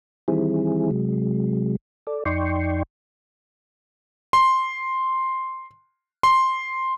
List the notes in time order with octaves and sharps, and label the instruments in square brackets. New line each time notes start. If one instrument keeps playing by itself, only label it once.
[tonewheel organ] D#3 E3 G3 C4 E4 G#4
C3 F#3 G#3
A4 D5
F2 D#4 D5 G5 C6 C#6
[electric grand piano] C6
C6